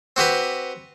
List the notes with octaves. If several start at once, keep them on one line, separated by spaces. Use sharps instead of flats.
C4 F#4 G4 B4